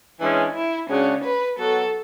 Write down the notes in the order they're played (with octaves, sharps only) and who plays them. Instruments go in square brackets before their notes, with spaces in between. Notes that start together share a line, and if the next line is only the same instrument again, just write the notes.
[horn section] E3 G#3 C#4 [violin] D4
[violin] E4
[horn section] C#3 G#3 D4 F#4 [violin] C#4
[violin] B4
[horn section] F#3 B3 F#4 [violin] A4